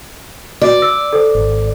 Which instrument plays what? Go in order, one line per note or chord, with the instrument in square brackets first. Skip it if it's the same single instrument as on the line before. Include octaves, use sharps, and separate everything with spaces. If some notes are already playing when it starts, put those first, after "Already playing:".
[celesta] F#4 [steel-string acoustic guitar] D5
[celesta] E6
A4 C5
[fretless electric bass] G#1